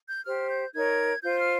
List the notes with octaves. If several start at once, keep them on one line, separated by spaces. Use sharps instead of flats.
G6
G4 C5 F6
G6
D#4 A#4 C#5 G#6
F4 C5 G6
F6